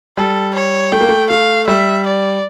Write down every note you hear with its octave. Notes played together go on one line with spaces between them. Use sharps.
G3 A4
C#5
A3 G5
A#3
A3
A3 F5
G3 E5
D5